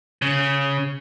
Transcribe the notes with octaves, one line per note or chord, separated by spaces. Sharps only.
C#3